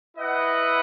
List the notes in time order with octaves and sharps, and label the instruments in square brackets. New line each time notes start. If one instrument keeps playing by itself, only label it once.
[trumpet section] E4 B4 D#5 F#5